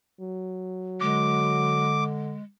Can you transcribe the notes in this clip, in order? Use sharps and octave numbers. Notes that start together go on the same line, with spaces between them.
F#3
D3 G#3 D6